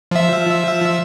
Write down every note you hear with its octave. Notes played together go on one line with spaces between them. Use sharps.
F3 E5